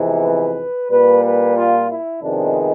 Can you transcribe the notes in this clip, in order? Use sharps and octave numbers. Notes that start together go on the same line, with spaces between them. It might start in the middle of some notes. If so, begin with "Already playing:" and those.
Already playing: F2 C3 E3 G#3 B3
B4
A#2 G3 A#3 B4
B4
F4
E4
F2 C3 D#3 G#3 B3 D4